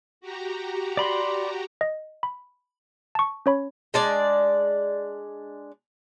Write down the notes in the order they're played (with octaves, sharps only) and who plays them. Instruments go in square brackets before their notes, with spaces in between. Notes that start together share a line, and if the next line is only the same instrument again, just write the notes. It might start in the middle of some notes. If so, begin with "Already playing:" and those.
[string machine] F#4 G4 A#5
[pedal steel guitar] D5 B5 C6
[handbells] D#5
B5
A5 C#6
C#4 C#5 B5
[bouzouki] G#3 D4 D5